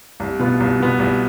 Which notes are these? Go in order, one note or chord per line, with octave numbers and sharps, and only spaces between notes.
C2
B2 B3 F4
C2
B2 B3 F4
C2